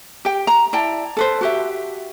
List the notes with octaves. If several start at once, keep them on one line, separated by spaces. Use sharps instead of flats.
G4 G5
A#5
E4 D5 G5 A5
A4 B4 C5
F#4 G4 E5